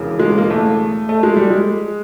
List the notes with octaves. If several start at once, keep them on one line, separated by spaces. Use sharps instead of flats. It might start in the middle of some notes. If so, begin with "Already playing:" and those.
Already playing: E1 E2 C#3
G#3
A#3
A3
A3
G#3
G3
G#3